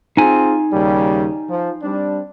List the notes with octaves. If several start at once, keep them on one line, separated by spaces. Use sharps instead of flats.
C4 D#4 F4 G#4 G#5
D#2 C#3 G3
F3
G3 C4 D4